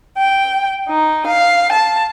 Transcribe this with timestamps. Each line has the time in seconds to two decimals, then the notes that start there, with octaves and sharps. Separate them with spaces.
0.16 G5
0.87 D#4
1.26 F5
1.72 A5